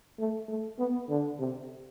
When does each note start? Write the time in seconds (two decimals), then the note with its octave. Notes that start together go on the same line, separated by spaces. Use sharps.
0.19 A3
0.49 A3
0.79 B3
1.10 D3
1.39 C3